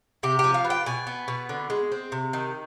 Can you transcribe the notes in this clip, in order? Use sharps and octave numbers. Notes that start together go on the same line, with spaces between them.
C3 G4
G4
F3
F5
B3
G5
B2 G#5
B3
B2
D3
G#3
C4
C3
D#3